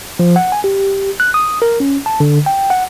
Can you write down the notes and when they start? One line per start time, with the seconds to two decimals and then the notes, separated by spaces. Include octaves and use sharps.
0.19 F3
0.36 F#5
0.52 G#5
0.64 G4
1.20 F#6
1.34 D#6
1.62 A#4
1.80 C#4
2.06 A5
2.20 D3
2.46 G5
2.70 F#5